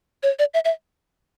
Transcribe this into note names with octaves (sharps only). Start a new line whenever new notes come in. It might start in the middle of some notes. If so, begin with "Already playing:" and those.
C#5
D5
E5
E5